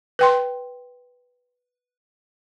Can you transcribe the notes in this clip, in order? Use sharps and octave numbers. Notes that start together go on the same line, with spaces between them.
B4 G5 C6